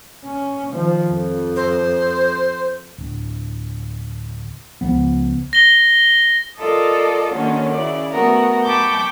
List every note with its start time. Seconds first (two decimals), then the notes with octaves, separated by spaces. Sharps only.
0.25 C#4
0.72 D#3 F3
1.09 F2
1.56 C5
2.98 D1
4.81 C#2 F3 B3
5.53 A#6 G7
6.58 F4 A4 A#4 D5 D#5
7.32 D3 D#3 F#3 A#3 C#4
7.73 C#3 E4 D5
8.11 A3 B3 F#4 A#4
8.65 G5 A5 B5 C#6 D6 G6